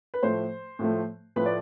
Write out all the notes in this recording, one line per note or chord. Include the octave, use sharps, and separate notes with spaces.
B4
A2 F3 A3 C5
A2 F3 A3
A2 F3 A3 B4
D5